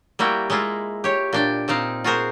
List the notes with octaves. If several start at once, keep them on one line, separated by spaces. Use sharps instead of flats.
G3 A#3 E4 F#4 G5
G#3 A#3 E4 F4
G4 C#5
A#2 D4 G5
A#2 C4 D#4 F5
F4 F#4 G#4 A#4 C5